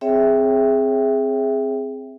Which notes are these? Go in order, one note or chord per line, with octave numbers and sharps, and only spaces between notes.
C4 G#4 C#5 E5 G5